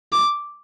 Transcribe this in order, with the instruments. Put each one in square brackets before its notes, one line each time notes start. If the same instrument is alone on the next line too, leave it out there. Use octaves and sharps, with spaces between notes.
[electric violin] D6